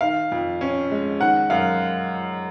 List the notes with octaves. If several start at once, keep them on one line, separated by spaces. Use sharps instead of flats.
D#3 F5
F2
C#4
G#3
D#3 F#5
F#2 F5